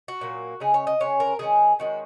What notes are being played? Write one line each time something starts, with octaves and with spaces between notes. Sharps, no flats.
F#4
A#2 F#3 A#3
C#3 G#3 C#4 G#4
C#5
D#5
C#3 G#3 C#4 C#5
A#4
D#3 G#3 C#4 G#4
D#3 G#3 C#4 F#4